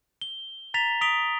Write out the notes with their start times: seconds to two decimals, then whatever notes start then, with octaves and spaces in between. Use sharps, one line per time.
0.22 G7
0.74 A#5 A6 B6 F7 G7
1.01 D#6 B6 D7 F7 G7